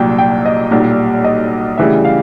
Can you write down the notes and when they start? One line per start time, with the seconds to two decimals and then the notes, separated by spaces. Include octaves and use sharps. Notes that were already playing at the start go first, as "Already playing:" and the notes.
Already playing: C2 A#2 F#3 G5
0.18 G5
0.46 D#5
0.71 B1 A#2 G3
1.24 D#5
1.78 D2 C#3 E3 G3 E5
2.05 F5